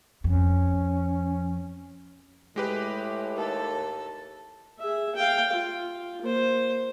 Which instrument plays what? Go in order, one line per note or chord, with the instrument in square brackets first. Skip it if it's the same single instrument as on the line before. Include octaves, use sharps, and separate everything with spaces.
[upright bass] F2 [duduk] C#4
[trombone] A2 [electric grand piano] G#3 G4 B4
[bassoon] D#2 [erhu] A4
[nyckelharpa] G#4 E5
F5 G5
F4
A#3 C5